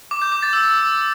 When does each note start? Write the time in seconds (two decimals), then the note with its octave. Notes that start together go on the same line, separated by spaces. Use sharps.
0.11 D6
0.22 G6
0.32 D6
0.43 A6
0.53 E6